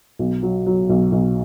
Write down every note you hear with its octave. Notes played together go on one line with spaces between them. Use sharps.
B1
F#3
F#3
B1
B1